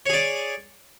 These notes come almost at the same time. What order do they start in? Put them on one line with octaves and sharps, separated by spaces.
C#5 G#4 D5